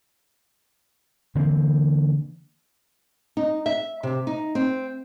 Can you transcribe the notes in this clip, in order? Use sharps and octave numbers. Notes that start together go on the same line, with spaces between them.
D3 E3 A#3 C4
D#4
E5
C3
D#4
C4